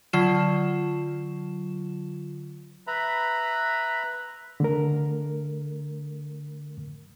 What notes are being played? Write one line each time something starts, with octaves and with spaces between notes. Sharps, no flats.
D3 F#3 F4 E7
B4 E5 A#5 B5
D3 A3 A#4